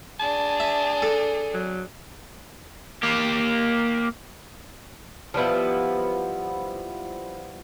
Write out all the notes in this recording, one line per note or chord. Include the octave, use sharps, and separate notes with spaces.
D4 G#4 A5
E5
A4
F#3
A#3 G4
F3 G3 B3 E4